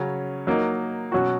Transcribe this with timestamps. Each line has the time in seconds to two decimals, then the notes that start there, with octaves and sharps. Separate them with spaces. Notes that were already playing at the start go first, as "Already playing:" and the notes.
Already playing: C#3 F#3 C#4
0.47 F#3 A#3 D#4
1.12 B2 F#3 C#4 F#4